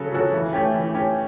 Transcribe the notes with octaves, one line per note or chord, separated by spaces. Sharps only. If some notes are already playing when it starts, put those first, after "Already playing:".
Already playing: C#3 F#3 C#4 F#4 A4
F#3 C#4 F#4 A4
E3
A3 C#4 G4
E3
A3 C#4 G4